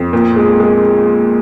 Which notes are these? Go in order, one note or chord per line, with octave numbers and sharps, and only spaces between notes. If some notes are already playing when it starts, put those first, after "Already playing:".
Already playing: F2
A#2
G#3
G#3